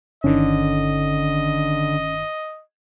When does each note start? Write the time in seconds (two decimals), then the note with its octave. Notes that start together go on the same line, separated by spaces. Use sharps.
0.24 G1 D3 D#3 C#4 D#5